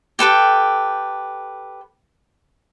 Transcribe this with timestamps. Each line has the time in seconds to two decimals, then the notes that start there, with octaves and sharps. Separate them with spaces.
0.19 G4 A4 B4 G5